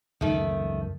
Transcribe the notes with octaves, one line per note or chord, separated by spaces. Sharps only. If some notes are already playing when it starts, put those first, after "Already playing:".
C#2 F#2 D#3 F3 A3